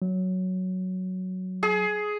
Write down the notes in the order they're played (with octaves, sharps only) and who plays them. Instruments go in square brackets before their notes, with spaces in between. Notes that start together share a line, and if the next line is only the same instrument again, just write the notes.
[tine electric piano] F#3
[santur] G#4